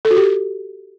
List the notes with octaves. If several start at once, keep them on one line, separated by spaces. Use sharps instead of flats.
A4
F#4
G4